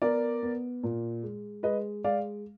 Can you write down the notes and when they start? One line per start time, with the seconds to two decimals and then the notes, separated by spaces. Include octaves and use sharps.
0.02 B3 A#4 D5
0.43 B3
0.83 A#2
1.23 G#3
1.63 G#3 B4 D#5
2.04 G#3 D5 F5